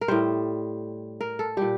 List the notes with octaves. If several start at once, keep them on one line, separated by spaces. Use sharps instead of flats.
A#4
A2 G3 C5
A#4
A4
A#2 G3 G4